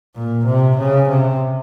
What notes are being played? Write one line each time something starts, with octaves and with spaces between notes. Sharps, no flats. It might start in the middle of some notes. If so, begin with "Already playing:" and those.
A#2
C3
C#3
C3